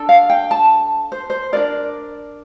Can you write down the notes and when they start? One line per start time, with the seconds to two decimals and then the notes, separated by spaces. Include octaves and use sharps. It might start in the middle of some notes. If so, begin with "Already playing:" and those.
Already playing: D4 A4
0.09 F5
0.30 G5
0.51 A5
1.12 C5
1.30 C5
1.53 D4 F4 A#4 D5